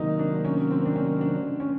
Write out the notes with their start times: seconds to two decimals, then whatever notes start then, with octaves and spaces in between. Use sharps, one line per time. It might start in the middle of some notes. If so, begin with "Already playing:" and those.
Already playing: C3 D#3 F#3 A#3 D#4
0.19 D4
0.45 C#4
0.71 C4
0.86 D4
0.96 C#4
1.21 D4
1.60 C#4